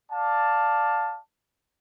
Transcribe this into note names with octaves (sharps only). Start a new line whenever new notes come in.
D5 F5 A5